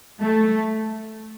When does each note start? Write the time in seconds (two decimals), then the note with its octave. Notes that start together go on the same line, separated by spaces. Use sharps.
0.22 A3